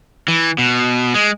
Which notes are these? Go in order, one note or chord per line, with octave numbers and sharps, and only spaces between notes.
E3
B2
G#3